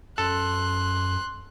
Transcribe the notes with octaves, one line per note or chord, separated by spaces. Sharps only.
F#2 A4 C6 F#6